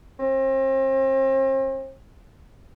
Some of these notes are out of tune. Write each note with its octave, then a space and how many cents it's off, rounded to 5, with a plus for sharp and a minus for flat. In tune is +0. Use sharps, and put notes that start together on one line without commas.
C4 +40